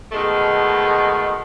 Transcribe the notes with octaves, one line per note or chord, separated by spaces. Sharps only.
B2 D#3 G#3 A3